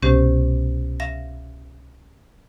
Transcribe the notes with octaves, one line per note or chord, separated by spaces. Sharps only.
C2 B2 C#4 G4 C5
E5 F5 A#6